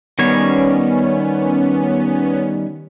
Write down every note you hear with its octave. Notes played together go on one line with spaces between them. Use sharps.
D#3 G3 B3 C#4 C#5